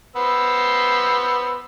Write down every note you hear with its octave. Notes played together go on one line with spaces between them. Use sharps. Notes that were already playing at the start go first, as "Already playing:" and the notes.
B3 C5 E6